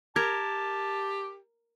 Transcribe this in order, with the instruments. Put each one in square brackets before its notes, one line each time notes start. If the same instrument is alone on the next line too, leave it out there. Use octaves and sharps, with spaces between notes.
[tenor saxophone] G4 [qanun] A#4 [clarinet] A5 [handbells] G#6